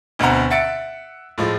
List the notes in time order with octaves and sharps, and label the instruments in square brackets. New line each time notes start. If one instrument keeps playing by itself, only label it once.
[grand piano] D2 B2 C4 F#5 A#5
E5 F#5 A6 C#7 D7
A2 F3 G#3